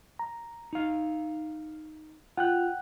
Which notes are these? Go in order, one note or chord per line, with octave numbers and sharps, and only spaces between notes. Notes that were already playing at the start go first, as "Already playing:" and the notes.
A#5
D#4 F5
F4 F#5 G5 F#6